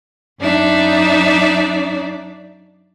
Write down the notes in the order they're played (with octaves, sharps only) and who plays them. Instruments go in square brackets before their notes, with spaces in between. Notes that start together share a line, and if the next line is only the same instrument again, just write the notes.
[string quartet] F#2 D4 D#4 D5 E5